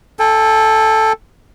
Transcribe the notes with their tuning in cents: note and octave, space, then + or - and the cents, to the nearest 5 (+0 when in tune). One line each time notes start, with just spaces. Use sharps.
A4 -5 G5 +45